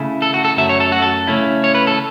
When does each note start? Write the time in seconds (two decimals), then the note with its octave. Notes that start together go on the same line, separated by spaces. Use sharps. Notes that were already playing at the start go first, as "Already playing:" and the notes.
Already playing: C#3 A3 E4
0.22 A4
0.34 F#4
0.45 A4
0.57 F#2 F#3 A3 E5
0.69 C#5
0.80 A4
0.92 F#4
1.02 A4
1.27 C#3 A3 C#4 E4
1.64 C#5
1.75 B4
1.87 A4